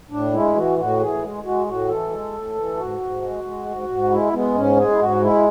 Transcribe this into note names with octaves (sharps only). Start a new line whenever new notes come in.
A2 D4
G#3 E4
E3 F#4
A2 F#4
E3 G#4
G#3
G#3 F#4
A2 F#4
E3 A4
G#3
A2
E3
G#2 F#4
G#2
G#3
G#3
G#2
G#2
G#3 E4
G#3 B3
G#2 C#4
G#3 G#4
E4
G#2 F#4
G#3 E4